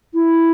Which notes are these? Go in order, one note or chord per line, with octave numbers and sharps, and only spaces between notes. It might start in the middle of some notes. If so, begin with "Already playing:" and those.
E4